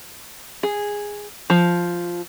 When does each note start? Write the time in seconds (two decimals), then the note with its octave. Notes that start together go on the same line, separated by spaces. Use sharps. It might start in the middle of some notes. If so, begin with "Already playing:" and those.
0.63 G#4
1.50 F3